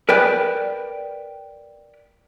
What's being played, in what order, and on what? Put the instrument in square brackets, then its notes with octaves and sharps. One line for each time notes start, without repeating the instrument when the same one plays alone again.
[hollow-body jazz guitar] A#4 B4 D5 G5